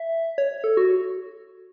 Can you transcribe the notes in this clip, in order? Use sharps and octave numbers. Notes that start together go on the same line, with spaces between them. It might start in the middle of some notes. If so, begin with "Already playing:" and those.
Already playing: E5
C#5
A4
F#4